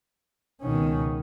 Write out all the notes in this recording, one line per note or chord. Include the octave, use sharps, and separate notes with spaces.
C#2 B2 D#3 C#4